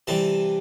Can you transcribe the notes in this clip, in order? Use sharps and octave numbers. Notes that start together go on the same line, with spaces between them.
C3 E3 G3 A5